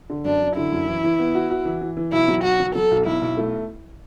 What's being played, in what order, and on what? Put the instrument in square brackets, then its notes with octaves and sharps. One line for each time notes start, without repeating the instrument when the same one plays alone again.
[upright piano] D3
[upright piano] F#2 [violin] D4
[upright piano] F#2
[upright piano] D3 [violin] E4
[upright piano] F#2
E3
E3
B3
F#4
F#4
E3
E3
E3
[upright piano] B1 [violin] E4
[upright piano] F#3
[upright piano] B1 [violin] F#4
[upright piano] F#3
[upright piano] F#3 [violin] A4
[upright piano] B1
[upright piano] B1 [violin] E4
[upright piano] B1
A3